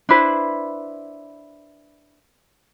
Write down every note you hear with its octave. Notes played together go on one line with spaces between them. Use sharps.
D4 E4 B4 C5